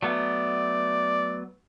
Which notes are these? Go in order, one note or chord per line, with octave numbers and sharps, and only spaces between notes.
F#3 A3 B3 D5